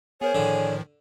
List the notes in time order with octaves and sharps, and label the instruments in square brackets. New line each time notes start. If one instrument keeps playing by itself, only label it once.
[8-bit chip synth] B3 A#4 C5 [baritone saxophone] G#4 [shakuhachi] C#5
[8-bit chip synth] A2 D#3 F3 [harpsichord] D3